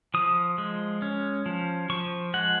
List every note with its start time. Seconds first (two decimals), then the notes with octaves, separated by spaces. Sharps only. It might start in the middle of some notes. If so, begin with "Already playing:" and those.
0.14 F3 D#6
0.58 G#3
1.02 C#4
1.46 F3
1.90 F3 C#6
2.34 G#3 F#5